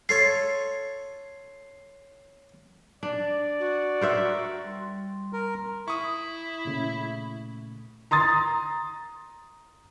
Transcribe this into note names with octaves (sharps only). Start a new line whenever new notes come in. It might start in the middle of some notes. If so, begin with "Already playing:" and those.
F4 A4 C#5 C7
D4 D5
F#4
A#4 C5 E5
G3 C6
A#4
E4 C#6 D#6
A#2 C#3 A3
A#5 C6 D#6 A6